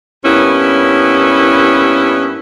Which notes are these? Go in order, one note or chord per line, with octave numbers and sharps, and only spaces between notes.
G2 A#3 B3 C#4 E4